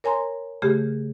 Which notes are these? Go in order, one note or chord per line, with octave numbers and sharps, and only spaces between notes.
A#4 C#5 G#5 A#5 C6
C#3 A3 G4 G#4